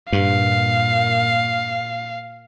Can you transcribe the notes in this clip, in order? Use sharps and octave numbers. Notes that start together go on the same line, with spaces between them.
G2 A#2 F5